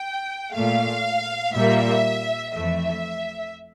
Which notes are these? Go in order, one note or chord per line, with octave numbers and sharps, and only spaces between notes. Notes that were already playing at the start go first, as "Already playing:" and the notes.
Already playing: G5
A#2 A3 F5
A#2 G3 A#3 E5
F2 E3 A3 E5